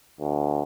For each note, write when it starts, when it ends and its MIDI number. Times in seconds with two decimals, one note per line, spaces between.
0.20 0.62 38